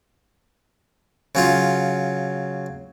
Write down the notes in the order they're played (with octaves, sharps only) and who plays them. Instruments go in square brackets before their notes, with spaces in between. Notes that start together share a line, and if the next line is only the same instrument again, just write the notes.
[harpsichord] C#3 F#3 F4